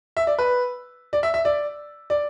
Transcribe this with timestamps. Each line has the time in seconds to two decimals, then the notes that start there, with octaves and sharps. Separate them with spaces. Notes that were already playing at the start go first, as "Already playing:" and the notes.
0.17 E5
0.27 D5
0.38 B4
1.13 D5
1.23 E5
1.34 E5
1.45 D5
2.10 D5